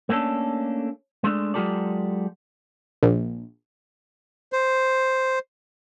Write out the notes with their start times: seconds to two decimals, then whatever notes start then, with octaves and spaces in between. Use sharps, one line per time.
0.09 A3 A#3 C#4 D4 A4
1.24 G#3 A3 D4
1.54 F#3 G#3 F4 G4 A4 D5
3.03 A#1
4.53 C5